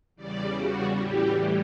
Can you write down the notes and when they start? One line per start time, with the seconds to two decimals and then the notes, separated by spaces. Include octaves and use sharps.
0.15 E2 C#3 G3 D5
0.57 F#4
0.98 A2 E3 G3 G4